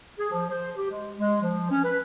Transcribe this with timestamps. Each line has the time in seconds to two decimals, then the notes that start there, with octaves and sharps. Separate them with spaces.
0.19 G#4
0.31 F3
0.50 C5
0.76 G4
0.90 G#3
1.18 G#3
1.42 F3
1.70 C#4
1.84 B4